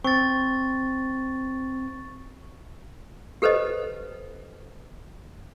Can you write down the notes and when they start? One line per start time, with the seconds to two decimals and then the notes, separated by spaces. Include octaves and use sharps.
0.04 C4 C#6 A6
3.42 G4 A4 B4 C5 D#5